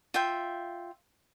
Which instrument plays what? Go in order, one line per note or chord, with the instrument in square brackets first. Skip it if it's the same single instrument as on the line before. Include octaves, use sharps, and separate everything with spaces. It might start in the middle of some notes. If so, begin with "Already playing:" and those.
[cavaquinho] F4 E5 G5